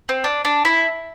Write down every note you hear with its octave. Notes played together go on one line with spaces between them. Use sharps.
C4
D4
D4
E4